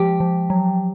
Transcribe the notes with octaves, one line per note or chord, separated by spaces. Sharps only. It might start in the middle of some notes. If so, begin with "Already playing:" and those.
Already playing: F3 G#3 G4 G5
F3
F#3